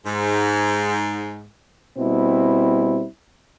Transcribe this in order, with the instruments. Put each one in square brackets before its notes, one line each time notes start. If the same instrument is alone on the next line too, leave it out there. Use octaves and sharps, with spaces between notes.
[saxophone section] G#2
[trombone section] B2 G3 C4 E4